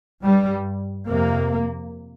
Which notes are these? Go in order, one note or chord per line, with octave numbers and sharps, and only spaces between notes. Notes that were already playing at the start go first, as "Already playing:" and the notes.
G2 G3
F2 C3 A#3